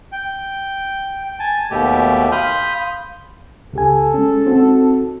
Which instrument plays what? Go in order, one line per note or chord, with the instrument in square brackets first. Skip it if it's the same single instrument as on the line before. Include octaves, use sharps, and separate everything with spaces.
[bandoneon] G5
G#5 A5
D#2 B2 A3 G4
F5 B5 C6 D#6 F6 G6
[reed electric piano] C#2 G4 G#5 [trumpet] A4
[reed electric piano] G#3 C#4
C4 D#4 F#4